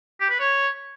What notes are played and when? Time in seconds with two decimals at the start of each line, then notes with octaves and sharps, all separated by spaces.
0.20 G4
0.30 B4
0.40 C#5